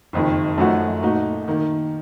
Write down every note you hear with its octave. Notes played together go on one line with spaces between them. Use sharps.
F#1 F2 D#3
F#2 F3 A3 D#4 F#4
A#2 A3 D#4 F#4
D#3 A#3